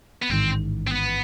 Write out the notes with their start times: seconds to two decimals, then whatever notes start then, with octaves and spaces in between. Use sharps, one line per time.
0.22 B3
0.30 A1 G#2 D#3 C4
0.87 C4
0.92 B3